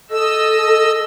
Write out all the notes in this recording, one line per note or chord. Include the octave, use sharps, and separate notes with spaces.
A4 D#5 E6